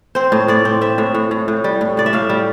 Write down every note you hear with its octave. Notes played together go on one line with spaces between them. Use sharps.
C4 C5
A2
A2 D5
C4
C4 E5
A2
A2
A2
A2
G3
A2
A2 D5
E5
A2 F5
G3